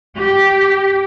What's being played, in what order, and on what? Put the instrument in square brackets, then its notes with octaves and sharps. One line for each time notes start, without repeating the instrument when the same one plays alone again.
[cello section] G4